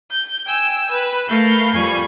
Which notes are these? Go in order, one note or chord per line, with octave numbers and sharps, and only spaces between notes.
G6
G5 G#5 E6
B4
A3 A#4 F5 B5 G6
F2 G3 G#5 B5 C#6